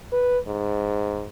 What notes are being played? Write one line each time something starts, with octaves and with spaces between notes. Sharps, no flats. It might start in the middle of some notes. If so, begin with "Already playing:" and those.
B4
G#2